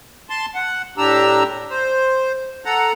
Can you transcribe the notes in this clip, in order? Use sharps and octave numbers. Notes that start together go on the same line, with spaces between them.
A5 C6
F#5
A2 D4 G4 A#5 E6
C5
A4 F#5 A#5